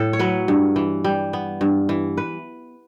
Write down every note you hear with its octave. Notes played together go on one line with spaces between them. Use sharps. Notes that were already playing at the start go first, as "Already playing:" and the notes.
Already playing: A2 A4
C#5
F#3 B4
G2
E3
G3
B3
G2
E3
B4